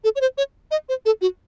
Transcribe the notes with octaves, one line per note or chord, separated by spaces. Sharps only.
A4
C#5
C5
C#5
D#5
C5
A4
F#4